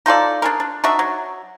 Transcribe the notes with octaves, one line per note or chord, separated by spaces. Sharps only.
D#4 F4 A4 D5
D4 G#4 A#4
D4
D4 D#4 F#4 E5
F#3